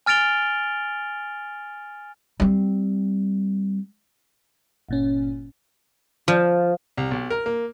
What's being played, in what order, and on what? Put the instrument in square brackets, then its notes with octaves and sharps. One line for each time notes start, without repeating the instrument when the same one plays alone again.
[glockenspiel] G#5 F6 A6 D7 F7 G7
[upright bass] G3 C4
[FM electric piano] G1 A#2 C#4
[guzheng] F3
[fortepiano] C2
B1
A#4
A#3